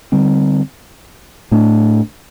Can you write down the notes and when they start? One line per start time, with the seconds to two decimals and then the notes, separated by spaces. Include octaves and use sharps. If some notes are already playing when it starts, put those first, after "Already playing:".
0.12 D3 G3 C4
1.51 A2 A3 D4